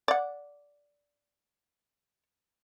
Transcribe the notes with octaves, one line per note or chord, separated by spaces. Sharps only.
D5 F#5